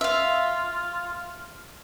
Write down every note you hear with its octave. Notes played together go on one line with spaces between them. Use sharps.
F4 E5 F5